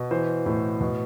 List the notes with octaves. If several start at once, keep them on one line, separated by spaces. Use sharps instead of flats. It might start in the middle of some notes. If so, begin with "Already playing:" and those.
Already playing: B2
E3 C5
A2
B2